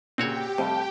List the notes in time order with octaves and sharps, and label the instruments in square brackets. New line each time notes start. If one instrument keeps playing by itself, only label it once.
[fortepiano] A#2 C#3 [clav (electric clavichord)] C4 F#4 C#5 [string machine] G4 G5
[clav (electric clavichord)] F2 [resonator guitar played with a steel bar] C3 A5 [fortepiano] G3 A3 C4